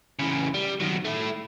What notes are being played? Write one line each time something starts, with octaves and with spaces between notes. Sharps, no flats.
C#3 E3
G3
D#3 F#3
A3 E4